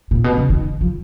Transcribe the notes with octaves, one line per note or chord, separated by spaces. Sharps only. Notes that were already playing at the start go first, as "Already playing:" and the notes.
A#2
B2
C#3
D#3
F3